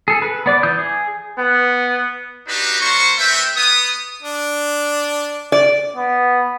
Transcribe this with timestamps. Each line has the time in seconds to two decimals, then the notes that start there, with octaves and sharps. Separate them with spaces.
0.08 G#4 A4
0.22 B4
0.46 B3 D5 D6
0.63 E3 D#6 G6
0.79 G#4
1.38 B3
2.48 D4 D#4 F#4 G4 B4
2.80 G3 A#3 C5 C#6
3.18 A3 C4 B4 E5 G5
3.56 B3 D#6
4.23 D4
5.52 D5
5.96 B3